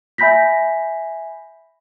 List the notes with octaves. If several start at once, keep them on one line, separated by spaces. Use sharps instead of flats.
E5 G#5 B5 G6 A#6 B6